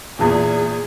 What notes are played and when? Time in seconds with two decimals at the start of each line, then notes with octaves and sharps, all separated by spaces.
0.19 E2 A#2 G#4